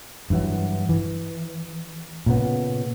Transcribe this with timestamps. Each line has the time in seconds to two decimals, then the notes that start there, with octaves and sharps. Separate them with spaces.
0.30 G2 E3 F#3
0.89 E3
2.26 A#2 C#3 B3